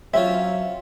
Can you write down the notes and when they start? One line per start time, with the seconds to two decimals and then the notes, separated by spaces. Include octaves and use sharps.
0.14 F#3 C4 C#4 F4 C#5 E5